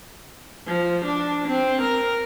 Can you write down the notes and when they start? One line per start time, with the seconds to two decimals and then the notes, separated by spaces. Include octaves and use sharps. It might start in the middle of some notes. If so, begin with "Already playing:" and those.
0.67 F3
1.05 D4
1.48 C4
1.81 A#4